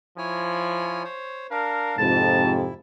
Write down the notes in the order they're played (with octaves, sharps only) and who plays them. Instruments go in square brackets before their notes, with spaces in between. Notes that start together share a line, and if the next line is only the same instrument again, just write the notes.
[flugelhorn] F3 [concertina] E4 C#5 G#5
[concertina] C5 C#5
[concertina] D4 F5 [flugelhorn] A#4
[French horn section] F2 G#2 C3 [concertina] E4 [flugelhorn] A5